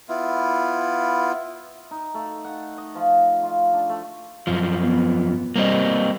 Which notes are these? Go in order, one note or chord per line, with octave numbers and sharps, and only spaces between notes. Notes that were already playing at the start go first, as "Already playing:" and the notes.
B3 E4 F4
D#4
A3
F#5
D#5
F3
F4
D4
A3
F#2 F3
B3
G3 A#3 C4 D#5